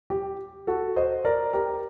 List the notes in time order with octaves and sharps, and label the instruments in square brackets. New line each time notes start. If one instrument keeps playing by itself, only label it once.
[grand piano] G4
F#4 A4
C5 D#5
A#4 D5
G4 A#4